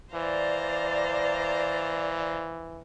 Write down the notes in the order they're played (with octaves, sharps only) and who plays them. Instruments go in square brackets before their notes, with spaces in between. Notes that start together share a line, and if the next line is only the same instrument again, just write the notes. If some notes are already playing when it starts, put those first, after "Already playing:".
[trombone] E3 [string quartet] C5 F5 A#5 [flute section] D5